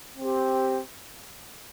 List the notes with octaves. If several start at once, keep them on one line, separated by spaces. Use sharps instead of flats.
C4 G4